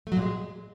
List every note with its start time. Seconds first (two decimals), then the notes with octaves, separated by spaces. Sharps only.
0.07 A3
0.12 F#3
0.17 A#2
0.22 G#3